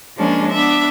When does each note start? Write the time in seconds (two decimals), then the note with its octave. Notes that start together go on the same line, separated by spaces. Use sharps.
0.18 F3 G#3 A#3 C#4 D4
0.52 B3 D4 E5